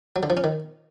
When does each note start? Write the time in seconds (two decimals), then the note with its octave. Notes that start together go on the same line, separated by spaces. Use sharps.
0.16 F#3
0.23 D3
0.30 F3
0.37 C#4
0.44 D#3